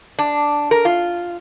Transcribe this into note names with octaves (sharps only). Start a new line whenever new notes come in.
D4
A#4
F4